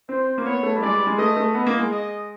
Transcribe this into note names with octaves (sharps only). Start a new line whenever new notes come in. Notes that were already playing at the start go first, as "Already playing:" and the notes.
C4 C5
A#3
B3 C#5
A3
G3
G#3 D5
G3
G#3
A3 D#5
A3
B3 D#5
A#3
G#3
D#5